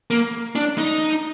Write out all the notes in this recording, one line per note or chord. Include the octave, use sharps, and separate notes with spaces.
A#3
D4
D#4